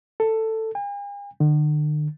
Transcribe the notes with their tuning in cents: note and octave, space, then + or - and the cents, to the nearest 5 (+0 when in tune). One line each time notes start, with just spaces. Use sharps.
A4 +10
G#5 -45
D3 +45